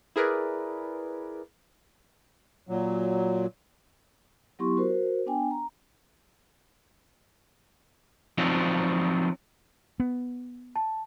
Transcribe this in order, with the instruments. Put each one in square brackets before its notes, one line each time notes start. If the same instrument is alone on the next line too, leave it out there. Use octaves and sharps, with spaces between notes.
[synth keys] E4 G#4 A#4 B4 D5
[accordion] A#2 F#3
[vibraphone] F#3 B3 E4 G4 C6 C#6
F#4 A#4 C5
B3 D4 G5 G#5
A#5
[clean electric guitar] F3 F#3 C4 D4 D#4 F4
[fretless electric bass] B3
[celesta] A5